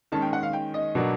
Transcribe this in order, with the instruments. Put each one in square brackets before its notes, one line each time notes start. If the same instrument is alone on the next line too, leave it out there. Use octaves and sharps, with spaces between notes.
[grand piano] D#3 G#3 C#4 [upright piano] A5
[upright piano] G5
F#5
F5
G5
D#5
[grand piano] B2 F#3 A#3 D4